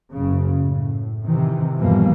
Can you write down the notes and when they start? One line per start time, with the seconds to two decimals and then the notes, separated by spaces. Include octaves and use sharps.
0.12 F#1 C#3
0.58 A2
1.25 C3 D#3 E3
1.80 E2 G2 B2 E3 F3 A#3